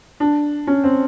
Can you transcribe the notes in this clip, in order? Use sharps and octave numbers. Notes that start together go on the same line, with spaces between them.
D4
C#4
C4